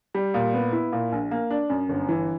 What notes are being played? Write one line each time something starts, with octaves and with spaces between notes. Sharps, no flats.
G3
A#2
B3
E4
A#2
A#1
A#3
D4
F#2
G1
E3